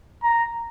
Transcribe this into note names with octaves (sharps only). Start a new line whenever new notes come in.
A#5